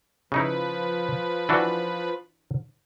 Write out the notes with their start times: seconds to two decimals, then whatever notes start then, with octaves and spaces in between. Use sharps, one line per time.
0.32 C#3 F3 D#4 E4 B4
1.49 E3 D4 F#4